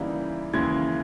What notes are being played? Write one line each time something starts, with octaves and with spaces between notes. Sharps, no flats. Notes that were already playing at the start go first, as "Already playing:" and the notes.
Already playing: C#3 E3 G3 A#3 D#4
D#2 C#3 E3 G#3 G#6